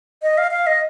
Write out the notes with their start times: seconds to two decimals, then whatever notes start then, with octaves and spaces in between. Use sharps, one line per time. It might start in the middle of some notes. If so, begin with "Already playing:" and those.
0.23 D#5
0.38 F5
0.51 F5
0.67 D#5